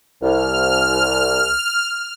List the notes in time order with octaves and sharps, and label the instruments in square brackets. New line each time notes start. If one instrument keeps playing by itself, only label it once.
[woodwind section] C2 [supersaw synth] F6